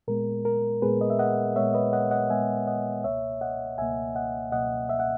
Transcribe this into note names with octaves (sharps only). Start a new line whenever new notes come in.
A#2 G#3 B3 A#4
A#4
A#2 G#3 B3 G#4 B4
D#5
E5
D#5 F#5
A#2 G#3 B3 C#5 E5
B4 D#5
D#5 F#5
D#5 F#5
A#2 G#3 B3 E5 G#5
D#5 F#5
C#2 B2 A#3 C#5 E5
D#5 F#5
C#2 B2 A#3 E5 G#5
D#5 F#5
C#2 B2 A#3 D#5 F#5
E5
F#5